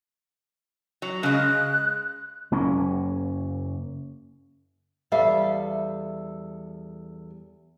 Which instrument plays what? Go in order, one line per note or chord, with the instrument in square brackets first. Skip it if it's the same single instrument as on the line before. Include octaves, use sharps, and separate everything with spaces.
[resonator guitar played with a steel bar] F#3
[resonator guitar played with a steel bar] C#3 G#3 [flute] F#6
[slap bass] F#1 A#3 C#4
[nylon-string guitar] E2 G3 A4 E5 F5